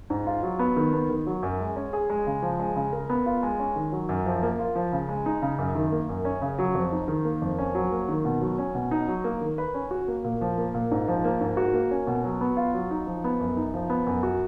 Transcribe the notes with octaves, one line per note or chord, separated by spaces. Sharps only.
G#2
F4
F#3
B3
D#3
B3
D#3
F#3
F#2
G#3
C#4
G#4
G#3
C#3
F3
G#3
C#3
A#4
B3
F4
G#3
C#4
D#3
F#3
F#2
F3
A#3
F4
F3
C#3
G#3
D#4
C#3
F#2
D#3
A#3
F#2
C#4
C#3
F#3
F2
D#4
D#3
A#3
F2
C#4
F#3
A#3
D#3
B2
F#3
C#4
B2
D#4
F#3
A#3
D#3
B4
C#4
F#4
A#3
A#2
F3
A#3
A#2
G#2
F3
A#3
G#2
F#4
A#3
C#4
B2
F#3
B3
F4
F#3
D#4
F3
B3
F#2
D#4
F3
B3
F#2
F#4